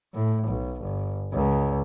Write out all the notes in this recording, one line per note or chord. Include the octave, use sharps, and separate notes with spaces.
A2
B1
G1
C#2